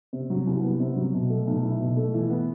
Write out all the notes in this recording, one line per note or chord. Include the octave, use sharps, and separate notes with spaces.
C3
F#3
C2
B3
C3
F#3
B2
A3
B1
E4
B2
A3
E3
B3